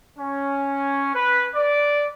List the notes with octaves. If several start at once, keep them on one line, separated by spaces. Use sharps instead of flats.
C#4
B4
D5